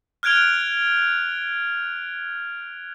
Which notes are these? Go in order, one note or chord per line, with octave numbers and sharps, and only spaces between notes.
F6 F#6 G#6 D7 F7 G7